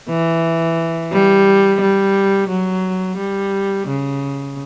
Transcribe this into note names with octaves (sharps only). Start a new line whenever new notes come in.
E3
G3
G3
F#3
G3
C#3